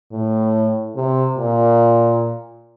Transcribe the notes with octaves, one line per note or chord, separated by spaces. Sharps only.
A2
C3
A#2